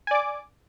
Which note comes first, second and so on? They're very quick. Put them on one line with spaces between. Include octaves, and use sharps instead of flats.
G#5 D5 D6